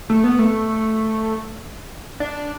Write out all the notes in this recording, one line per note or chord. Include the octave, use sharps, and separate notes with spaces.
A3
B3
A3
D4